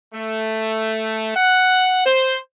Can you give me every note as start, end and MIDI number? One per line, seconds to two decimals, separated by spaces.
0.13 1.32 57
1.36 2.05 78
2.05 2.37 72